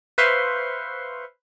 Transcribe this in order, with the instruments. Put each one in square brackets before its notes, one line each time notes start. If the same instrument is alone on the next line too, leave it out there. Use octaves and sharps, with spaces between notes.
[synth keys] B4 C5 E5 F5 C6 C#6